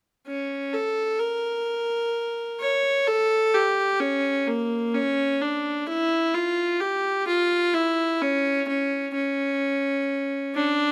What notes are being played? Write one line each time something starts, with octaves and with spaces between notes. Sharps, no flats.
C#4
A4
A#4
C#5
A4
G4
C#4
A#3
C#4
D4
E4
F4
G4
F4
E4
C#4
C#4
C#4
D4